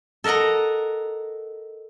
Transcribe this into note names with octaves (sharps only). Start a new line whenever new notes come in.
A4 A#4 D#5 F#5 A#5